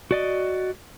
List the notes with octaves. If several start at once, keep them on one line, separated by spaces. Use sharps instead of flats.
F#4 D5 D#5